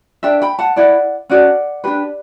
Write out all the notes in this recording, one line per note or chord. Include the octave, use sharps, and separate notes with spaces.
D4 A4 E5 G5
G5 B5
F#5 A5
E4 B4 D5 F#5
C#4 F#4 A4 D5 F#5
D4 G4 B4